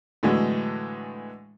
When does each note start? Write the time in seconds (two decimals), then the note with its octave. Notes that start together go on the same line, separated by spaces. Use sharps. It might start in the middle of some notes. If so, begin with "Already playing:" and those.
0.23 A2 D3 E3 F#3 G#3